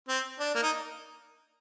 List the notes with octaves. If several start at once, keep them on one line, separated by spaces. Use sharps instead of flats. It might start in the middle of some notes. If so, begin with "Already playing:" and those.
C4
D4
A#3
D#4